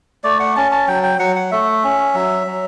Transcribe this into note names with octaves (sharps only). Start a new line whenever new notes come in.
A3 D5
F#5
C#4 A5
A5
F#3 G5
G5
F#3 F#5
F#5
A3 E5
C#4
F#3
F#3